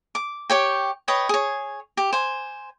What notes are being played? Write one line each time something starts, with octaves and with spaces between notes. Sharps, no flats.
D6
G4 C#5 G5
B4 C#5 D#5 G5
G#4 C#5
G4
C5 G#5